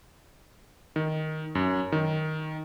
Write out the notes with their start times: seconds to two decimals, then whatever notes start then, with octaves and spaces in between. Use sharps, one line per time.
0.96 D#3
1.55 F#2
1.92 D#3